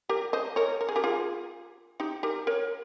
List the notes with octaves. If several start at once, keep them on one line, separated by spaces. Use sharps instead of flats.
G4 A#4
C5 D#5
A#4 C#5
A#4
G#4
G4 A#4
F4 G#4
D#4 G4
G4 A#4
A#4 C#5